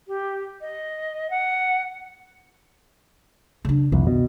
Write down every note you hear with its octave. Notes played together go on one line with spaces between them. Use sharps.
G4
D#5
F#5
C#3 D4
C2 F2 D#3
B2